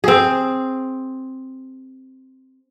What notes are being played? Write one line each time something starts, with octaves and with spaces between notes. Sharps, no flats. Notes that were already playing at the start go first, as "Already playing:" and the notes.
C4 G#4